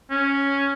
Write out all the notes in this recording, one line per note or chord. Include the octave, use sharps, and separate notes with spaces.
C#4